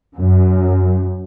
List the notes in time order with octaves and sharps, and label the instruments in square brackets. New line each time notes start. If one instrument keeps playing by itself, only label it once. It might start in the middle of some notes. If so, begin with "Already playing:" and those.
[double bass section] F#2